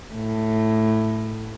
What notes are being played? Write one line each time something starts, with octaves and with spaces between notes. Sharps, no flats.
A2